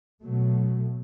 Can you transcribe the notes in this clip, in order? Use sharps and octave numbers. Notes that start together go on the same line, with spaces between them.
B2 F#3 A3